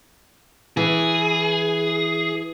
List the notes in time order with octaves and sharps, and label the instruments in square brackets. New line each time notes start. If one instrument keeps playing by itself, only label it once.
[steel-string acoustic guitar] E3 [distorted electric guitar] G#4